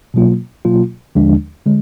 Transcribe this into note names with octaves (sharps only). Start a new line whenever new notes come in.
B2 F#3 A#3 F4
B2 F#3 A#3 F4
D#2 D3 F3 G#3 D4
D3 G#3